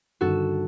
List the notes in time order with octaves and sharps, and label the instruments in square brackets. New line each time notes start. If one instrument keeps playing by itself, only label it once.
[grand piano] G1 G2 D#3 [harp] F#4 A4